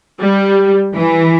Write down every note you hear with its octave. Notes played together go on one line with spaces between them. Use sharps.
G3
E3